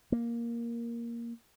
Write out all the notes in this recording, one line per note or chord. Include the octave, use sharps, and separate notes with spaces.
A#3